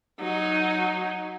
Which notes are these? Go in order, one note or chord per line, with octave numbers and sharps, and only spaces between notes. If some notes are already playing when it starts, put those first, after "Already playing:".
F#3 D#4